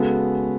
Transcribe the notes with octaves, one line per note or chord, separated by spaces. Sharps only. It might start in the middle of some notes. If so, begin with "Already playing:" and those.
Already playing: C#3 G#3 B3 F#4 A4